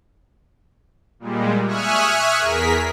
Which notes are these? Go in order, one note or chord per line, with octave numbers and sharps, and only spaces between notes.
A#2 G3 G#3
E5 G#5 C#6 D#6 F6 F#6
E2 G#4 A#4 B6